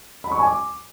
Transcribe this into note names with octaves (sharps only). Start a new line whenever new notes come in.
B5
C#6
G#5
D6